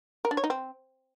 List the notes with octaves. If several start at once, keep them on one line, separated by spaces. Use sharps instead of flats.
A#4
D4
C#5
D#4
C4